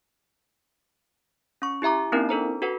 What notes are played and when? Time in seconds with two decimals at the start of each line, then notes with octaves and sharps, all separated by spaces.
1.62 C#4 C#6
1.82 E4 G4 E5 A#5 D6
2.12 A#3 C4 C#4 D#4 E4 A#4
2.29 D4 A4 C5 A#5
2.62 F#4 A4 B4 F#5